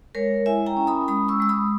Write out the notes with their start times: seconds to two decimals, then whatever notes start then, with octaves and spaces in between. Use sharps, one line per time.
0.15 G#3 A#4 C#5
0.46 E4 E5 G#5
0.66 G5 A#5
0.77 C#4
0.87 B5 D#6
1.08 G#3 B5 D#6
1.28 C#6 E6
1.40 G#3 E6
1.49 B5 D#6